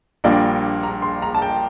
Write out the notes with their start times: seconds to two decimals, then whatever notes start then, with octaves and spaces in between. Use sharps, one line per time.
0.24 A#1 A#2 G3 A#3 D4 G5
0.83 A#5
1.02 C6
1.22 A#5
1.35 A5
1.42 G5